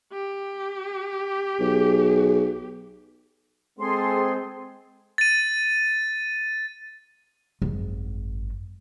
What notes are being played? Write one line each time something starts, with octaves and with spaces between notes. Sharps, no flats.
G4
B1 G#4
G#3 C4 G#4 A4 C6
A6 D#7
G#1 F#2